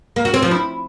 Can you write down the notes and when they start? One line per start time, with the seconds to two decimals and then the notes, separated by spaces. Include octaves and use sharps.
0.16 A#3
0.25 F#4
0.34 C4
0.42 F3
0.51 E4